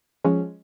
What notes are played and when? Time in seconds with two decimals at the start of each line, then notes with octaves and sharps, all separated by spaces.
0.24 F3 G#3 C#4